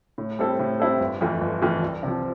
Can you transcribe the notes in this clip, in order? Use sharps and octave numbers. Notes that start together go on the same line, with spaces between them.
A2
G3 C4 E4 A4
A2
G3 C4 E4 A4
G1
F2 E3 A3
G1
F2 E3 A3
C2
C3 F3